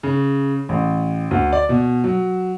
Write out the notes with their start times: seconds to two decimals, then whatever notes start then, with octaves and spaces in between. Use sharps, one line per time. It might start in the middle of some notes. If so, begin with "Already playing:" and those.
0.03 C#3
0.69 A1
1.31 D2
1.52 D5
1.69 B2
2.04 F#3